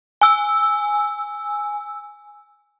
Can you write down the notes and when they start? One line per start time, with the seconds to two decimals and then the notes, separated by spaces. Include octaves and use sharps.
0.21 G#5 E6